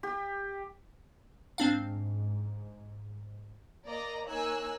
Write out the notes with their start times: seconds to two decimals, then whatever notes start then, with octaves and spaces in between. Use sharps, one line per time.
0.03 G4
1.58 G#2 C4 D4 F5
3.86 A#3 D5 D#5 A#5
4.27 A#3 D#4 C#5 G#5 E6 F#6